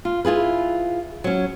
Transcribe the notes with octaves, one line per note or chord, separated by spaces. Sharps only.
F4
E4 F4 G#4 B4
F#3 C#4